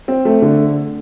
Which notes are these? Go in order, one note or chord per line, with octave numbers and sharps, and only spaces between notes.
C4
A3
D3